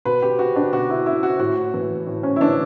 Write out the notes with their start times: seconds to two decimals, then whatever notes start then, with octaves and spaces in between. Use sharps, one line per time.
0.05 B2 B4
0.22 G4
0.39 F#4
0.56 D4
0.72 B2 F#4
0.90 E4
1.06 E4
1.23 F#4
1.39 A2 F#4
1.74 E3
2.07 A2
2.23 C#4
2.36 E4
2.40 E3 D4